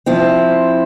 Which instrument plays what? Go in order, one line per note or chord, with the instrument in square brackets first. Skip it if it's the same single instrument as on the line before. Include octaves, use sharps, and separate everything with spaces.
[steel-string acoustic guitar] F3 C4 E4